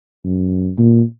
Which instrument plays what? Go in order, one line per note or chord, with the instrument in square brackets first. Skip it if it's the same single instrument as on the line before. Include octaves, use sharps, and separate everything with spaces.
[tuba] F#2
A#2